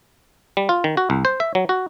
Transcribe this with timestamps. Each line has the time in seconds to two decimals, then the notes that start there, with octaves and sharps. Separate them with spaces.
0.57 G3
0.69 F4
0.84 D#3
0.97 F#4
1.10 C2
1.25 C5
1.40 E5
1.55 F#3
1.69 F#4